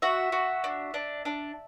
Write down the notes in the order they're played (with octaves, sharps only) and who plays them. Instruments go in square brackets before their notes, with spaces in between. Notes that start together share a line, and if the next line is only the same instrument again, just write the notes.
[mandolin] F#4 E5
F#4
D4
D4
D4